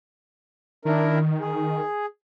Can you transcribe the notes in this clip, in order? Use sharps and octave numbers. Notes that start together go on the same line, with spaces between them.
D#3 D4 E4 A#4
G#4